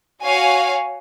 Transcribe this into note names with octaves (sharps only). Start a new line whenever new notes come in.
F#4 C#5 F5 G#5